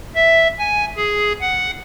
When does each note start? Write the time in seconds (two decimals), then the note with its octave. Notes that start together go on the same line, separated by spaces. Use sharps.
0.15 E5
0.59 G#5
0.96 G#4
1.41 F#5